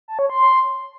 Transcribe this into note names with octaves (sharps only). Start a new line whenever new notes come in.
A5
C#5
C6